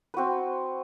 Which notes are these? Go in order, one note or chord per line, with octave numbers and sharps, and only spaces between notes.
C4 F#4 B4